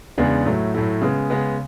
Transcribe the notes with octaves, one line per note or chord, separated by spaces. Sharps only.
E2 C#3 G#3 B3 D4
A2 F#3 A3 E4
A2 F#3 A3 E4
C#3 G#3 B3
C#3 G#3 B3